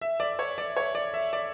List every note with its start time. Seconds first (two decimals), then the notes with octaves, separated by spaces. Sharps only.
0.01 E5
0.20 D5
0.39 C#5
0.58 D5
0.77 C#5
0.95 D5
1.14 E5
1.33 D5